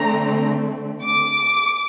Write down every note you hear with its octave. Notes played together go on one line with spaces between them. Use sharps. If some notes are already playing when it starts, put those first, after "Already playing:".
Already playing: D3 A3 C4 A#5
D6